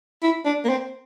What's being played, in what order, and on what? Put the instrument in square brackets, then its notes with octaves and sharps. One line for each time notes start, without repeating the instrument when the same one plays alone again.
[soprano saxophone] E4
D4
A#3
C4